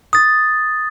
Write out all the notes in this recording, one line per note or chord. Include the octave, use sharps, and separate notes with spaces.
D#6 A6